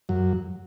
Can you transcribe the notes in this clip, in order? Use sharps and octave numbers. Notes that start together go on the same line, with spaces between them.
F#2 F#3